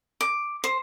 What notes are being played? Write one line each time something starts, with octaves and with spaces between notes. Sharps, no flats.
D6
C5